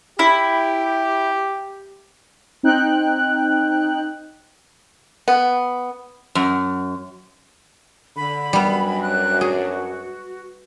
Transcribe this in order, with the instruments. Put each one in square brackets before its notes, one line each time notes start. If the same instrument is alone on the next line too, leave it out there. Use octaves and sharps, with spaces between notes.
[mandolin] E4 [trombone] G4
[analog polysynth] C4 D#4 G5 F#6
[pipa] B3
[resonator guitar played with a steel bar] F#2
[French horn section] D3 [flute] B5
[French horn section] F#2 F#3 D4 [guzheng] G3 B3
[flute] F#6
[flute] F#4 [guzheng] G#4